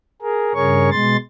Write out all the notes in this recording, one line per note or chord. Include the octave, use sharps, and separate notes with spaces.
G#4 A#4
G2 C#3 G#4 A#4 C#5 C#6
B2 G#3 C6 A6